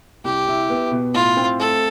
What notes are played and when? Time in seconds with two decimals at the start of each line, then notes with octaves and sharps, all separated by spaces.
0.24 C2 G4
0.48 E4
0.70 B3
0.91 B2
1.14 A2 F4
1.37 C4
1.59 A3 A4